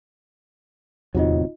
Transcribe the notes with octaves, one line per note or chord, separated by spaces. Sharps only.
D1 E2 C3 F#3 D#4 F4 D#5